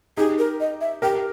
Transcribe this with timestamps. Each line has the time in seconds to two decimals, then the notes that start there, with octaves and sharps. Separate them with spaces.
0.17 D#4 G4 G#4
0.39 A#4
0.60 D#5
0.81 E5
1.02 G4 A#4 G5